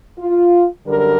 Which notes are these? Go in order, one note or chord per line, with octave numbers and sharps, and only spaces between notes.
F4
F#2 D3 G3 A#4